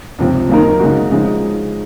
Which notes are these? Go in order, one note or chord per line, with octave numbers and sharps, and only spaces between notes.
C#2 C3 F3 C4
F#2 D#3 A#3 D#4 A#4
C#3 G#3 D#4 F#4
C#3 F3 G#3 D#4